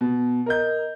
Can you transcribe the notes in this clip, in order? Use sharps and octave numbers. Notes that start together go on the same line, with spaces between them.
B2
A#4 D#5 G6